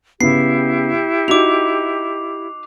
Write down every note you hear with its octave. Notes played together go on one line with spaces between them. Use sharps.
C#3 B3 E4 G4 C7
D#4 F#4 D6 F7